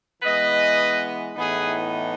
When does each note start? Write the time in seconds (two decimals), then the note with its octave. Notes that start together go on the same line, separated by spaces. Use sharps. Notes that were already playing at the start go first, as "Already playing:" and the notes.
0.22 E3 G#3 B3 B4 D#5
1.36 A2 E3 B3 D#4 G#4 B4